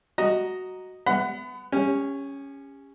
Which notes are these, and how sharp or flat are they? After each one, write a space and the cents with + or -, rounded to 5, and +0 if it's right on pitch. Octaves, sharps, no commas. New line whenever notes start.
F#4 +0 D#5 +0 A#5 +0
B3 +20 F#5 +0 B5 +35
C#4 +0 G4 +40